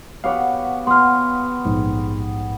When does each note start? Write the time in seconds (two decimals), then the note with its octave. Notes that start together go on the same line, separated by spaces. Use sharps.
0.24 B3 G4 C#5 F5 F#5
0.87 B3 C6 F6
1.65 A#1 G#2